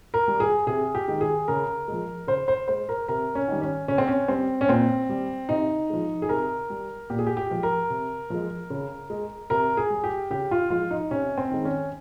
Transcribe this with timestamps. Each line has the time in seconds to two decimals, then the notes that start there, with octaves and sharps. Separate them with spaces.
0.14 A#4
0.28 G3
0.40 G#4
0.67 C3 G#4
0.95 G4
1.08 D#3 G#3
1.21 G#4
1.48 C#3 A#4
1.88 F3 G#3
2.27 C#3 C5
2.48 C5
2.68 G#3 C5
2.89 A#4
3.08 C3 A#4
3.35 C#4
3.48 D#3 G3
3.62 C#4
3.88 C#3 C#4
3.98 C4
4.08 C#4
4.28 G3 C4
4.61 C#4
4.69 A#2 C4
5.09 G3
5.49 C3 D#4
5.90 F3 G#3
6.22 G#4
6.29 C3 A#4
6.70 G3
7.10 A#2 G4
7.19 G#4
7.26 G4
7.37 G4
7.50 F3 G#3
7.63 A#4
7.90 C3
8.30 F3 G#3
8.70 C#3
9.10 G#3
9.50 C3 A#4
9.77 G#4
9.90 G3
10.04 G4
10.30 C#3 G4
10.51 F4
10.70 F3 G#3 F4
10.91 D#4
11.11 C3 C#4
11.38 C4
11.51 D#3 G#3
11.65 C#4